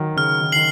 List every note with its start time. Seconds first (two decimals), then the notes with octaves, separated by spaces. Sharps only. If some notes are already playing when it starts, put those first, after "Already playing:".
Already playing: D#3 F#3
0.17 C#3 F6
0.41 D#3
0.52 D#3 C7 F#7